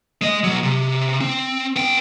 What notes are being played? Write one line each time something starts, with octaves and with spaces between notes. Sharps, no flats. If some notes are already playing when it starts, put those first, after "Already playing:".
G#3 D#5
B1 F#3
C3
C4
B3 G5